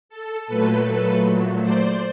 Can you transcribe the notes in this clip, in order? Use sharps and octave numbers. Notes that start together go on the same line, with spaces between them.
A4
A#2 F#3 A3 A4 B4
A4 B4
C5 D5